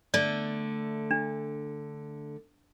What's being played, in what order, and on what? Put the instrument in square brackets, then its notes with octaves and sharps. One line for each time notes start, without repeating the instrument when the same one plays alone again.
[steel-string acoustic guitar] D3 A3 [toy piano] D5
[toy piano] D4